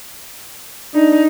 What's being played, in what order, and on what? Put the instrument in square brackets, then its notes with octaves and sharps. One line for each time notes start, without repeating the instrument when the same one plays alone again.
[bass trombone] D4 [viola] D#4